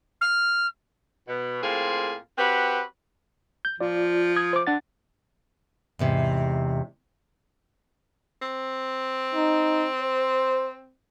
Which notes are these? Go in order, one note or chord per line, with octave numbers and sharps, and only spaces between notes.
F6
B2
A2 A#3 C4 F4 G#4
C4 F#4 G4 B4
G6
F3 F4 D5
D#6 G#6
C5 D6
D4 F#5 A6
E2 G#2 C3
C4
D#4
C5